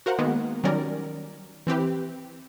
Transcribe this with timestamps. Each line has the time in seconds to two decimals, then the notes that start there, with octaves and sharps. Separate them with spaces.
0.06 F#4 A#4 C5 F5 F#5
0.19 D#3 G#3 A#3 B3
0.64 D#3 F#3 G3 C#4 A#4 D5
1.67 E3 C4 G4 B4